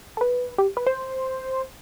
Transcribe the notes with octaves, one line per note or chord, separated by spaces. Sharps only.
A4
B4
G4
B4
C5